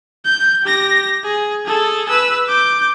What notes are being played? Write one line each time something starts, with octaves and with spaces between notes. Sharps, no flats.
G6
G4 A#6
G#4
G#4 A4
B4 E6
D6 G6